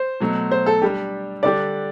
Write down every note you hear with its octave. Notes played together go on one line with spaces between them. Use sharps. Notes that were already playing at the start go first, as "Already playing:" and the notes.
Already playing: C5
B2 F#3 A3
C5
A4
G3 D4 G4
D3 G3 D4 G4 D5